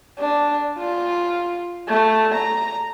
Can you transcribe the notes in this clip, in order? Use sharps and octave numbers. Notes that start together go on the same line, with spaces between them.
D4
F4
A3
A#5